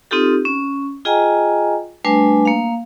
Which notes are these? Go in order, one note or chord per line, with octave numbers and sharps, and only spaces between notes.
C4 D#4 F4 G4 A4
C#4
F4 G#4 D#5 G5 G#5 A#5
G3 A3 D4 B4 G#5
A#3 F5